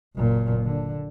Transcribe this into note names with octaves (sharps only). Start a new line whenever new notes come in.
F#1 A#2
D3